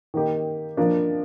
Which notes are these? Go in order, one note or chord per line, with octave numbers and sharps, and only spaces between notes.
D#3 A#3 D#4 G4
F3 A#3 D4